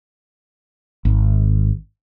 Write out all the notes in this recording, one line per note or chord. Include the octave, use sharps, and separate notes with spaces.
G#1